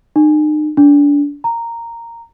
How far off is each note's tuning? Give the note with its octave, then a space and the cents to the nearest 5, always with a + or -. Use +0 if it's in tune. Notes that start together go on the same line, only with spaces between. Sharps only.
D#4 -40
D4 -30
A#5 -10